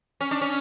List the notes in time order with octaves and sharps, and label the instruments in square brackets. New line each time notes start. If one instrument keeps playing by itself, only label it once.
[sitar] C#4
D4
C#4